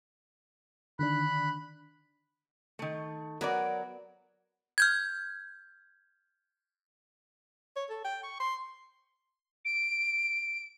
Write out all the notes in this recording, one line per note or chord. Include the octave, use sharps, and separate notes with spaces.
D3 D#3 D4 B5 F#6
D#3 A3
F#3 B3 A#4 D5
F6 G6 G#6
C#5
A4
G5
C#6
C6
D7